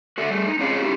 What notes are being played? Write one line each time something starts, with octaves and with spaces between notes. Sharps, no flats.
F#4 A4 E5
G3 A3
D#4
C4 C#4 F4 G#4 C#5 F5
C#4 D#4 E4 G4